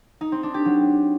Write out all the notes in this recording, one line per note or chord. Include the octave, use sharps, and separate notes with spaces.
D#4
C4
D4
G4
F#3